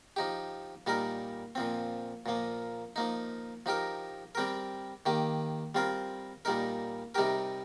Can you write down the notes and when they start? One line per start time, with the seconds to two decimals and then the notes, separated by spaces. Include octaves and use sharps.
0.16 F3 D#4 G4
0.87 A#2 G3 D#4 A#4
1.55 A#2 F3 C4
2.26 A#2 F3 A#3
2.96 F3 A#3 D#4
3.66 F3 D#4 G4 A#4
4.35 G3 C4 G4 A#4
5.06 D#3 A#3 G4
5.75 G3 C4 F4 A#4
6.45 A#2 G3 D#4 A#4
7.15 C3 G3 D#4 G4 A#4